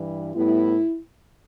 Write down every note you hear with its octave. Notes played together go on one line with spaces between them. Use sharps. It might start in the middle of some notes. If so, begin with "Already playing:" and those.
Already playing: G2 E3 G3
A2 G3 B3 E4